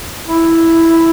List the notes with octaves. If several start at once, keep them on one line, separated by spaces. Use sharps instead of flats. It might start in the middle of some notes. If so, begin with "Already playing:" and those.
E4